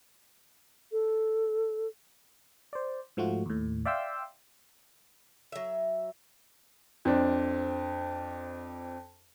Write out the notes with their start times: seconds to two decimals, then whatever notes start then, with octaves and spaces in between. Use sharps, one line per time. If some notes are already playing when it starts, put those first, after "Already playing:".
0.92 A4
2.73 C5 D5
3.17 G#2 F3 A3 F4 F#4
3.46 D#2 A2
3.85 D5 E5 F5 G5 C6 E6
5.52 F#3 E5
7.05 F2 C4 D4